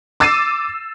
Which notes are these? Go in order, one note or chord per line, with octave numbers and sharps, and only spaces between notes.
D6 E6 A6 C7 D#7